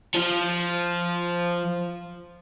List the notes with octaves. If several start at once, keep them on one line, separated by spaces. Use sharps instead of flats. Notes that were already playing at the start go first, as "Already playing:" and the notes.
F3 F4